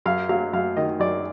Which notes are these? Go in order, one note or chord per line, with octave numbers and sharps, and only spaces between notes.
F#2 F5
F#3 F5
F#2 F5
D#3 D#5
F#2 D5